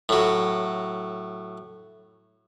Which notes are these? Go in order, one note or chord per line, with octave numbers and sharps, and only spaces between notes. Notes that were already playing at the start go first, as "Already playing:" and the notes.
A2 F#3